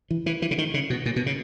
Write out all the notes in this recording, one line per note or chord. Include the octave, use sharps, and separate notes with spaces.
E3
E3
E3
C#3
D#3
C#3
B2
A#2
B2
C#3